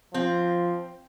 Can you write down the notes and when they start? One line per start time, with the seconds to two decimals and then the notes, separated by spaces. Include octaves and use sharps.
0.14 F3 C4